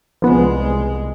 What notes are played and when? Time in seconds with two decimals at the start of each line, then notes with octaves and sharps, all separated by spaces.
0.22 C2 F3 G#3 B3